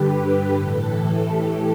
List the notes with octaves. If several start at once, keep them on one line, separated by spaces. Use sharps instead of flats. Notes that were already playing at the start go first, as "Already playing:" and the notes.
Already playing: G2 D3 G4 B4
A2 E3 A4
G4